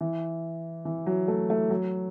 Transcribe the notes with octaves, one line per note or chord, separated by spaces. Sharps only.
E3
E3
F#3
A3
A3
F#3